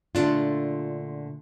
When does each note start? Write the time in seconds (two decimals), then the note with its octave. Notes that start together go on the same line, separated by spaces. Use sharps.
0.15 A#2 D3 A3 D4 F4